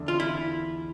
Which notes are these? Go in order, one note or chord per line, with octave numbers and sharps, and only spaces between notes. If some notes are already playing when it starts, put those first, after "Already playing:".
Already playing: E2 D3
F4
E4